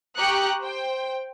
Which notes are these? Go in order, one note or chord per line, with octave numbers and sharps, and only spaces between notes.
G4 A#5 C#6 D#6 F#6 C#7
C5 G5